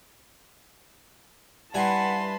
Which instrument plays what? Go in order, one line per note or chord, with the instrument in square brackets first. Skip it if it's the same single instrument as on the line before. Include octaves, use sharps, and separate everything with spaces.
[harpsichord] G2 E4 G#5 [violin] B4 C6 [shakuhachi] F#5 [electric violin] A5 B5